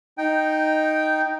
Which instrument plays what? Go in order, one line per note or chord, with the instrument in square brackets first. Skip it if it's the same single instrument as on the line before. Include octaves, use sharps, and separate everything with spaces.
[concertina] D#4 G5